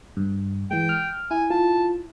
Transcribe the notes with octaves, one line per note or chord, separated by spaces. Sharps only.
G2
E3 G#3 G5
F6
E4 G#5
F4 A5